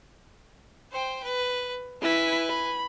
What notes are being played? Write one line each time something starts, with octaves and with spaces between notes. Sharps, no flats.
C5 G5
B4
E4 B4 G#5 B6
B5